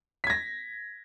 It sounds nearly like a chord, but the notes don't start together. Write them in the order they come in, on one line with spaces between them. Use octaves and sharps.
B6 G#6 A#6